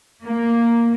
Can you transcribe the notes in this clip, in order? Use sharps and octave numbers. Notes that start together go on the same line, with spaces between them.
A#3